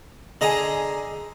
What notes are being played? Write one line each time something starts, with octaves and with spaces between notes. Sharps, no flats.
D3 G#4 D#5 G#5 A#5